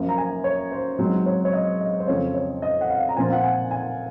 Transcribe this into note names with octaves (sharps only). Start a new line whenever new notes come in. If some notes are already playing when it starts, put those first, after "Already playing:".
Already playing: F#2 F3 A#3
A#5
G#5
C#5
C5
G#2 F#3 C4 C5
C#5
C#5
D#5
D#5
C5
F2 C#3 F3 C#5
C#5
D#5
F#5
F5
A#5
A#2 F3 C4 F4 G#5
F#5
G#5
G#5